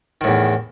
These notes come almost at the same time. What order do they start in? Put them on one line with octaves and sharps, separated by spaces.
D#3 A2 E2